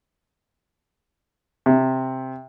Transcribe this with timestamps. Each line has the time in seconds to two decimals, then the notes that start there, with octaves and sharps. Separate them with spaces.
1.66 C3